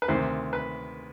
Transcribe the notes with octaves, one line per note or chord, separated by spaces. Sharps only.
B4
D2 C3 D#3 C5
B4